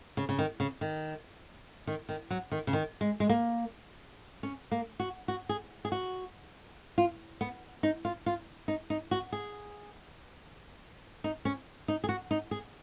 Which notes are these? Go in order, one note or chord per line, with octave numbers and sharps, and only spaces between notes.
C#3
C#3
D#3
C#3
D#3
D#3
D#3
F#3
D#3
C#3
D#3
G#3
G#3
A#3
C#4
A#3
F#4
F#4
G#4
G#4
F#4
F4
B3
D#4
F4
F4
D#4
D#4
F#4
G#4
D#4
C#4
D#4
G#4
F#4
D#4
G#4